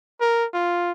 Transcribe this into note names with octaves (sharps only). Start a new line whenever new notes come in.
A#4
F4